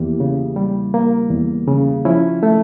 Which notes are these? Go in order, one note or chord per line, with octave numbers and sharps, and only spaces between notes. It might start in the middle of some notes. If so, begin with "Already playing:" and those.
Already playing: E2 A#3 E4 G4
C#3
G3
A#3
E2
C#3
F3 C#4 E4
A3